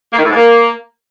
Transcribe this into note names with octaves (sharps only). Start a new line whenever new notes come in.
A#3
D#3
A2
G#2
A#3